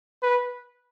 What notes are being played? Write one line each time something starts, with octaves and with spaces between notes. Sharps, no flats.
B4